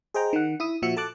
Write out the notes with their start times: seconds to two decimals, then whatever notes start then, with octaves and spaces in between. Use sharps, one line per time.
0.14 G#4 C5 D#5 G5 A#5
0.33 D#3 F#5
0.60 E4 E5 D#6
0.82 A#2 F3 F#4 E5 C#7
0.97 A4 A5 D6 F#6